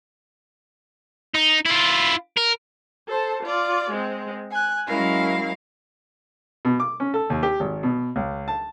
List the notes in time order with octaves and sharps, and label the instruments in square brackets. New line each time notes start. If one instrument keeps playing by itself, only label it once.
[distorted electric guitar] D#4
E4 F4
A#4
[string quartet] A4 C5 A5
F4 D5
G#3 C4
G#5 F#6
F#3 G#3 C#4 E4 A#4 F5
[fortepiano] B2
D6
C#4
A4
D#2
G4
G#1
B2
C#2
A5